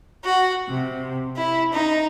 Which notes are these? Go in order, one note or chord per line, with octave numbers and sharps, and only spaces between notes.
F#4
C3
E4
D#4